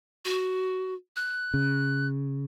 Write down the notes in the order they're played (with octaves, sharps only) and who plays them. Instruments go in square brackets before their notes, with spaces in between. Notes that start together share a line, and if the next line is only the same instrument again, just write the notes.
[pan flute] F#4
F#6
[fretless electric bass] C#3